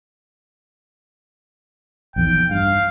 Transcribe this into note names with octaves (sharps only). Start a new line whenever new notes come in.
A#1 E2 D#3 G5
G2 F5